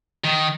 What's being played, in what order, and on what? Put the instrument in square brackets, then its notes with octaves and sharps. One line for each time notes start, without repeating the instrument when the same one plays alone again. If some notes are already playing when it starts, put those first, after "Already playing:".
[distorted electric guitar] D#3